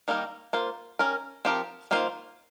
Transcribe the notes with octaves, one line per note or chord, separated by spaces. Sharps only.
D#3 G3 A#3 D#4 A#4
A#3 F4 C5
C#4 G4 A#4
F3 C4 G4 A#4
D#3 A#3 F4 C5